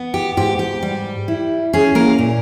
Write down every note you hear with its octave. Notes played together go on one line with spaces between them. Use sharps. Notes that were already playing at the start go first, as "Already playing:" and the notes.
Already playing: B3
G4
G#2 G4
G4
G3
E4
C#4 G#4
A#3 A#4
A#2